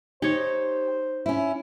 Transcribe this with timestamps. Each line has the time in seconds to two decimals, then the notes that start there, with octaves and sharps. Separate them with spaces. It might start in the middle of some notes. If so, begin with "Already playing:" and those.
0.22 D#4 G4 C5 C#5 C#6
1.26 C#4 E4